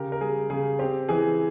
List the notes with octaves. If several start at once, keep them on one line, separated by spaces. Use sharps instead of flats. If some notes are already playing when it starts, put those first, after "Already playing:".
Already playing: C#3 G4 A#4
A#4
G3 G#4
C#3 G#4
C4 G4
E3 G#4